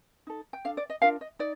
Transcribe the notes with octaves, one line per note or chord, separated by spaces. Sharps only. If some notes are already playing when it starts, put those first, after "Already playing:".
D#4 A4
G5
D4 A4 F5
D5
D#5
D4 F4 A#4 F5
D#5
D#4 D5